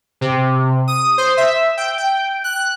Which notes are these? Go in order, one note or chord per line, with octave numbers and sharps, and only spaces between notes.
C3
D#6
C5
E5
G5
G5
F#6